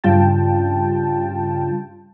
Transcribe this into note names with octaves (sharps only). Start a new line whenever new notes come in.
G2 C#3 G3 F4 G5 A5